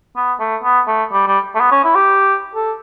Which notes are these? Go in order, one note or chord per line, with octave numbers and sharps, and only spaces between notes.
B3
A3
B3
A3
G3
G3
A3
B3
C#4
E4
G4
A4